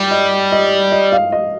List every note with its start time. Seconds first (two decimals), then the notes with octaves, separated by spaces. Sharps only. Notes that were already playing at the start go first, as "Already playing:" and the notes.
Already playing: G3 D5
0.11 D#5
0.52 D#5
0.92 D#5
1.12 F5
1.32 D#5